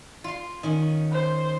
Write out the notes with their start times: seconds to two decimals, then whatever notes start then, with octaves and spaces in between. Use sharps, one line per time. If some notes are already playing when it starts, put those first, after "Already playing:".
0.24 F4 C6
0.63 D#3 C#4
1.12 C5